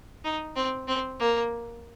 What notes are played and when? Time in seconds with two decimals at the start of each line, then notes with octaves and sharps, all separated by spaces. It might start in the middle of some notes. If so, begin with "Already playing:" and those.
0.24 D#4
0.56 C4
0.88 C4
1.20 A#3